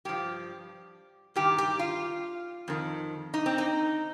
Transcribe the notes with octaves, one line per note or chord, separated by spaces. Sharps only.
G2 F3 G4
G2 D#3 G4
G4
F4
F2 D#3
D#4
C4
D#4